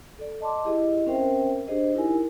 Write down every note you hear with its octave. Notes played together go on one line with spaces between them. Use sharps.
A4 D5
D#5 A5 C6 D6
E4 G4 G#4 D#5
C4 C#4 A#4 C5 E5 G5
D4 G4 G#4 C5 D#5
D#4 E4 G4 A#4 G#5